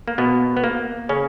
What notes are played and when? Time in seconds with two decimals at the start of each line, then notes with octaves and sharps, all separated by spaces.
0.08 A#3
0.18 B2 B3
0.57 B3
0.64 A#3
1.09 C#3 C#4